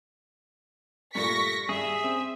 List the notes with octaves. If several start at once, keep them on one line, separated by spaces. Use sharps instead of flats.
G2 A#2 A3 C#6 A#6 B6
G2 G#4 E5
C4